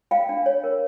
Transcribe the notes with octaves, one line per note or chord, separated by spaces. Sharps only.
F4 F5 G5
D4
C#5
A#4